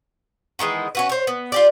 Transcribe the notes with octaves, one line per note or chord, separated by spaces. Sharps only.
D#3 E3 G#3 B3
C#4 F#4 B4
C5 C#5
B3
F4 G4 D5